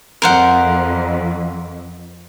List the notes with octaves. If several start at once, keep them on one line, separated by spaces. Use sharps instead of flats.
F2 A#4 C5 F#5